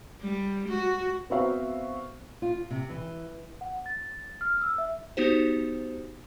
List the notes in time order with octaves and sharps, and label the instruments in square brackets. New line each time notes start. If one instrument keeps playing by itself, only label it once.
[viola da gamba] G3
F#4
[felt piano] B3 C4 F#4 E5 F5
[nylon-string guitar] F4
C3
E3
[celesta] F#5
A6
F6
E6
E5
[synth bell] B3 D#4 F#4 G4 C5